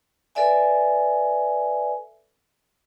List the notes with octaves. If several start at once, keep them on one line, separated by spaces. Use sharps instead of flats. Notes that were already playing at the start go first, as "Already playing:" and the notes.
A4 B4 D5 E5 G#5